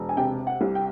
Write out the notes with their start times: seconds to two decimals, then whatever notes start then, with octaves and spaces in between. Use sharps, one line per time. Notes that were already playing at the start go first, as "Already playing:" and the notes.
Already playing: E1
0.09 G#5
0.17 C3 G5
0.47 F#5
0.61 C2
0.75 G5